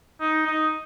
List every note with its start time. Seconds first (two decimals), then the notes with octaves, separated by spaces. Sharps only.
0.21 D#4
0.46 D#4